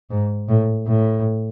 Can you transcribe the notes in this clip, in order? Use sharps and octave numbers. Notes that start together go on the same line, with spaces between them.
G#2
A2
A2